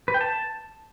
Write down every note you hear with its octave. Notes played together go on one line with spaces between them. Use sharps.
B4
G5
A5